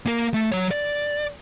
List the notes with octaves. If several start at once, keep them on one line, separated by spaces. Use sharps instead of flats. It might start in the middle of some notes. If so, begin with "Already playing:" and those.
A#3 A#4
A3
F#3 C#5
D5